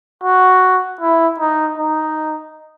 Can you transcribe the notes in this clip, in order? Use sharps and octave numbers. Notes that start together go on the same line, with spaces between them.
F#4
E4
D#4
D#4